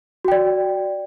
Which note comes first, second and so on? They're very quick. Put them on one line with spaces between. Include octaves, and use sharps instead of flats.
F#4 G5 D5